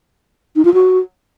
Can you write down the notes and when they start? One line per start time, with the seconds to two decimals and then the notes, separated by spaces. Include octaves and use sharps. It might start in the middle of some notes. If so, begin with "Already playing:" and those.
0.56 D#4
0.65 F4
0.74 F#4